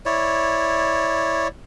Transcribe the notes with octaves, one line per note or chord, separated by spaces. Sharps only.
E4 C#5 D5